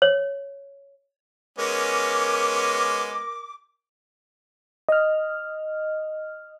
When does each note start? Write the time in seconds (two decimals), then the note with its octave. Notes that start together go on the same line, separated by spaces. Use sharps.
0.02 C#5
1.58 G#3 B3 C#4 A#4 D6
4.89 D#5 F6